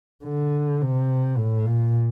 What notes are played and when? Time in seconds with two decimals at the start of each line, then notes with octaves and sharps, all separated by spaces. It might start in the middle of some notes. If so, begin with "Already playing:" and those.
0.25 D3
0.81 C3
1.38 A2
1.66 A#2